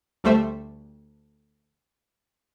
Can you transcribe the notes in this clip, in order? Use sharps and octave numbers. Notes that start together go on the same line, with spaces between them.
D2 G3 A3 C5 E5